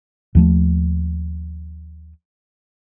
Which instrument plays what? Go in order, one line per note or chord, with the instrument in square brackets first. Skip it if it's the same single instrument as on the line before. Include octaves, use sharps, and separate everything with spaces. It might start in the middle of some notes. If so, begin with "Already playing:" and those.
[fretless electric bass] D#2 F3 A3